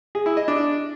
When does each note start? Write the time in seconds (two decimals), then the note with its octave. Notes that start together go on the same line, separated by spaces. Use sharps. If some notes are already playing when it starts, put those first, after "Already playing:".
0.15 G#4
0.26 E4
0.37 D#5
0.48 D4